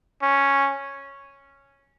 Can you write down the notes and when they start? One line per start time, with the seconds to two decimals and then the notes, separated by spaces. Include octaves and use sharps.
0.22 C#4